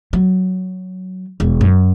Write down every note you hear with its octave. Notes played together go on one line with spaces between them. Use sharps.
F#3
E1
F#2